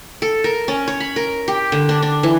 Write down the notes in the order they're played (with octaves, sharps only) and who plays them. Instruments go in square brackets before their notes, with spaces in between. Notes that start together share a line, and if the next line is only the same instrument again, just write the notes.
[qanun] A4
A#4
C#4
C#5
B5
A#4
G4
D3
D4
D4
E3